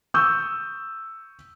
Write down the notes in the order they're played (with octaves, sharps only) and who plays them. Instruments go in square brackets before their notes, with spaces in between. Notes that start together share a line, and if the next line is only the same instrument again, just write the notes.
[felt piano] C#6 D#6 E6 G6